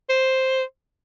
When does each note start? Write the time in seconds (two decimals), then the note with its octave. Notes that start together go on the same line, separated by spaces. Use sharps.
0.09 C5